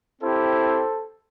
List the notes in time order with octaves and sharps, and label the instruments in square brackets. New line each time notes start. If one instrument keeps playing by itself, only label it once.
[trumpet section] C4 E4 G4 A4 C5